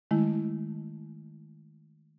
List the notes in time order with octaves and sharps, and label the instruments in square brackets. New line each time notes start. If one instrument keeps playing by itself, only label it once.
[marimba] D#3 G#3 A3 E4